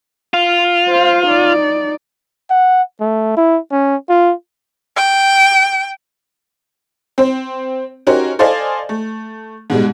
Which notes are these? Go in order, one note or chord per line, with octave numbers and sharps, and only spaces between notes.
F4
C5 F5
D#4 D5
F#5
A3
E4
C#4
F4
G5
C4 C5
C#4 D#4 F#4 G4 A#4 C5
A4 C5 D5 D#5 F5 G#5
A3
G#2 B2 G3 G#3